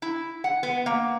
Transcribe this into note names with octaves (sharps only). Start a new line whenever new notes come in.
E4
F#5
B3
A#3